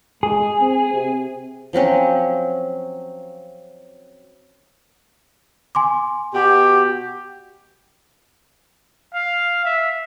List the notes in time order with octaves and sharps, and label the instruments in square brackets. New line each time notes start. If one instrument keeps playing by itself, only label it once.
[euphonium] G#3 [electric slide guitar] G#4
[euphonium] C4
C3
[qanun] F3 F#3 C4 C#4
[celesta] G#5 C6 D6
[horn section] B2 F#4 G4
[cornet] F5
E5